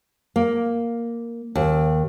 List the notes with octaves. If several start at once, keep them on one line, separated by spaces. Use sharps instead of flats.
A#3
D#2